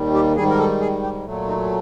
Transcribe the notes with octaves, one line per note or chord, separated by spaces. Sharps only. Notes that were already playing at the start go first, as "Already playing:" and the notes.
Already playing: D#2 D#3 G3
G4
G#2 D#3 G3 G#4
A#4
A4
G#4
G4
A#2 F#3 A3
D#4